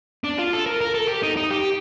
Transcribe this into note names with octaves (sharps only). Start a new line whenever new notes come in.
D4
F4
A4
A#4
A#4
A4
G4
D#4
D#4
G4